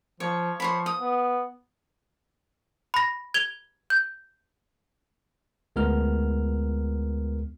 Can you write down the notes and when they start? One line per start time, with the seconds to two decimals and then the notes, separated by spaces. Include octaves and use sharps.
0.20 F3 C#5
0.60 F3 C5 C#5 B5
0.86 D#6
0.98 B3
2.94 B5 A#6
3.34 G#6 F7 G7
3.90 G6
5.76 D2 G#3 B3 F4 A#4 F6